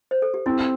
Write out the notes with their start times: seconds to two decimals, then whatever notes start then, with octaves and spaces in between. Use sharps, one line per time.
0.11 C5
0.22 A4
0.34 G4
0.46 C4 E4